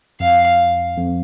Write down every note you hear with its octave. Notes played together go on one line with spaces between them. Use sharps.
F2 F5
F2